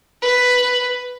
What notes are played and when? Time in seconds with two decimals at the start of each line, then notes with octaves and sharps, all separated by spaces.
0.22 B4